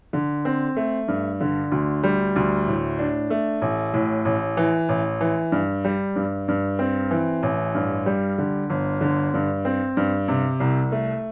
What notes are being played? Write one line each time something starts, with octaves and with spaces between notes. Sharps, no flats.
D3
C4
A3
G2
D3
D2
G3
D2
A2
D4
A3
A1
A2
A1
E3
A1
E3
G2
G3
G2
G2
C4
E3
A1
G2
G3
D3
G1
D3
G2
C4
G2
C3
C2
A3